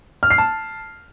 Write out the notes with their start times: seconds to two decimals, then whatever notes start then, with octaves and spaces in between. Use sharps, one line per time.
0.23 F6
0.30 C7
0.38 A5